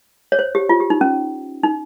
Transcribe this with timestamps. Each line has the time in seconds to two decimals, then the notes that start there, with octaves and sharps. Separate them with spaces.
0.32 C#5
0.39 C5
0.55 G4
0.69 F4
0.80 G4
0.90 D#4
1.01 C#4
1.63 D#4